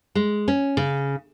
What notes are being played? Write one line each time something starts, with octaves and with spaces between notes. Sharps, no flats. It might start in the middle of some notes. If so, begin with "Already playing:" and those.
G#3
C#4
C#3